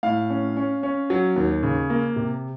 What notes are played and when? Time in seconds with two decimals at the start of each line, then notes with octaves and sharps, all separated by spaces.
0.03 A2 F5
0.30 C#4
0.57 C#4
0.83 C#4
1.10 F#3
1.36 D#2
1.63 C#3
1.90 A#3
2.16 C3